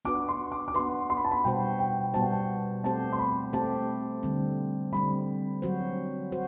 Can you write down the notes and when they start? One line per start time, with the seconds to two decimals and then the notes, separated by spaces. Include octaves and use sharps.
0.05 B3 D4 F#4 B4 D6
0.29 C6
0.52 D6
0.68 D6
0.74 B3 D4 F#4 B4 C6
1.10 C6
1.17 B5
1.24 A5
1.31 B5
1.44 B2 G3 B3 F#4 C5 G5
1.79 G5
2.14 B2 G3 B3 F#4 C5 A5
2.22 G5
2.31 A5
2.84 A3 C4 G4 C5 A5
3.12 C6
3.19 B5
3.53 A3 C4 G4 C5 A5
4.23 D3 G3 C4
4.93 D3 G3 C4 B5
5.62 F#3 C4 F#4 C5
6.32 F#4 C5